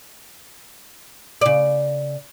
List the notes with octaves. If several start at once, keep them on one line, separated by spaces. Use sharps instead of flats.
C#3 D5